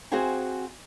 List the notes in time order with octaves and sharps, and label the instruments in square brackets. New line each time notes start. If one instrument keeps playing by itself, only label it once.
[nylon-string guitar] C4 F#4 G#4 C5 F5 G#5